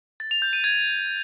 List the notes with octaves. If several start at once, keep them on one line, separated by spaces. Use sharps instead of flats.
A6
F7
G6
D#7
G#6